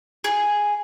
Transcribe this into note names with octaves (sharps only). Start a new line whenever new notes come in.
G#4